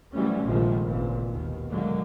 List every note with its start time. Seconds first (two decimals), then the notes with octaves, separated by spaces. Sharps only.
0.13 C3 E3 F#3 G3 A3 C#4
0.44 A#1 C3 D#3 F3 G#3 A3
0.85 G#1 C#2 A#2 E3
1.30 D#2 B2 D#3
1.69 B2 D3 F#3 G#3 A#3